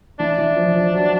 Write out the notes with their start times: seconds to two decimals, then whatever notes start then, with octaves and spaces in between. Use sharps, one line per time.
0.19 E3 D4
0.38 E3
0.57 F3
0.75 F3
0.94 F#3